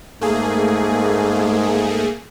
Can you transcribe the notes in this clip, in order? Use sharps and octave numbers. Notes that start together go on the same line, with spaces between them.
G#2 A3 A#3 G#4